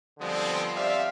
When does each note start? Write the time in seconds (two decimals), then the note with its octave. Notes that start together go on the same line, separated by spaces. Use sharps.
0.19 D3 F3 G3 G#3 B3 C4
0.75 C4 G4 D5 E5 F5